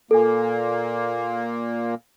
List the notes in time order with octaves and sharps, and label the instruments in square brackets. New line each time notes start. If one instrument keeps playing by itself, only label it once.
[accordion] A#2 A#3 [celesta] A4 G#5